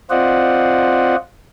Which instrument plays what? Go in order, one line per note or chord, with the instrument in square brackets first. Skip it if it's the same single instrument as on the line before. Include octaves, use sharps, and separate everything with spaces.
[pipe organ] C4 F4 C5 D5 D#5 F#5